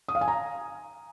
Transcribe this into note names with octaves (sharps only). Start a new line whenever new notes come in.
D#6
F5
G#5
A#5